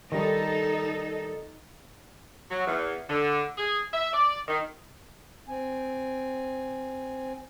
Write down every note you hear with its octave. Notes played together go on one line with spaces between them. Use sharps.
D#3 G3 D#4 A4
F#3
E2
D3
G#4
E5
D5
D#3
C4 G#5